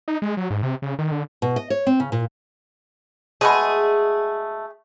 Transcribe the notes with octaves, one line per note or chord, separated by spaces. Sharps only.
D#4
G#3
F#3
G#2
C3
C#3
D#3
D3
B2
D#5
C#5
C4
C#3
A#2
B2 G#3 A3 G#4